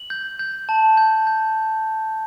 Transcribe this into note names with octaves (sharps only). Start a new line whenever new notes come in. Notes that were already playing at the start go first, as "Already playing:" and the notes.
Already playing: F#7
G6
G6
A5
G6
G6